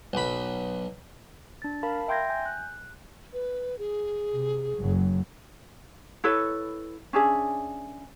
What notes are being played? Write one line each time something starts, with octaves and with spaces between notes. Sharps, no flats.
B1 B5
D4 A6
A#4 F5 A5 B5
E5 G5 C6 G6 G#6 A#6
G#5 G6
F#6
B4
G#4
C3
F#1 F#3
E4 A4 B4 C#5
C#4 D4 G#4 E5